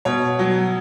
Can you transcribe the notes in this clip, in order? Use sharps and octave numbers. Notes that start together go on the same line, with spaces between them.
B2 C#5
F#3